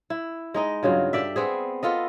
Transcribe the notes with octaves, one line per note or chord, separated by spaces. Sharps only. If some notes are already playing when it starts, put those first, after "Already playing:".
E4
G#3 D#4 D#5
G2 C#3 F#3 F4
G4 A4 D5 E5
B3 C4 G#4
B3 F4 A4 D#5